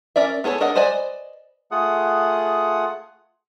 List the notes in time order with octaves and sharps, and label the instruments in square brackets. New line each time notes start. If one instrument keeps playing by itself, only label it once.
[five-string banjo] C#4 A#4 D5 E5
B3 G#4 A4 C5 C#5
D4 A#4 D#5 F#5
B4 C5 D5 D#5 G#5
[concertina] A3 F4 G#4 F#5 D#6